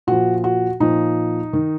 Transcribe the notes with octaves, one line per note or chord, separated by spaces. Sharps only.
A#2 F3 F#4
F#4
A#2 F3 D#4
D#3